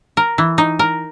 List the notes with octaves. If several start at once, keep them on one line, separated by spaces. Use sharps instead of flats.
A#4
E3
D#4
A#4